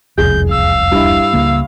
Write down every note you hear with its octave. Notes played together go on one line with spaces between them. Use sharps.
E1 C2 F2 G#4 G6
F5 E6
G2 E4
C#2 C#3 A#3